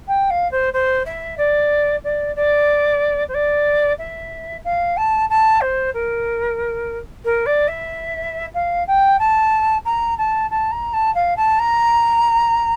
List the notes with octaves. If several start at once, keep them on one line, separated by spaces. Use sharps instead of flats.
G5
F5
C5
C5
E5
D5
D5
D5
C5
D5
E5
F5
A5
A5
C5
A#4
A#4
D5
E5
F5
G5
A5
A#5
A5
A5
A#5
A5
F5
A5
A#5